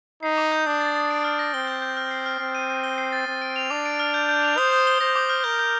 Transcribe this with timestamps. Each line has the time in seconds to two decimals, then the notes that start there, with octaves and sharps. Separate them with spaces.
0.23 D#4 C7
0.38 D6
0.52 G6
0.66 D4 D#6
0.81 A6
0.95 D#6
1.10 D7
1.24 F6
1.39 A#6
1.54 C4 G7
1.67 G6
1.82 G6
1.97 F6
2.11 C7
2.26 F6
2.40 C4 C7
2.55 D#7
2.70 D#7
2.84 G7
2.98 C7
3.12 A6
3.27 C4 A6
3.42 D7
3.56 F7
3.70 D4 D6
3.86 D7
4.00 F6
4.14 G6
4.29 G6
4.43 F7
4.58 C5 D#6
4.72 D#6
4.87 G7
5.01 C5 A#6
5.16 D6
5.29 F6
5.44 A#4 G6
5.59 G6